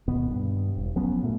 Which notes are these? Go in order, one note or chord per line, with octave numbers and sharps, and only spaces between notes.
D1 B2 D#3 B3
G2
E1
F3 F#3 B3 C#4
A#2 A3